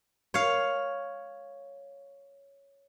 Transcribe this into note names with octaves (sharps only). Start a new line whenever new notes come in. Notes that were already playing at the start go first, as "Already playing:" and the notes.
C#5 F5